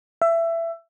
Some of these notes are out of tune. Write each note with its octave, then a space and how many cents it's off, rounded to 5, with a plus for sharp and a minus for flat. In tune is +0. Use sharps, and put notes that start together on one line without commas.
E5 +20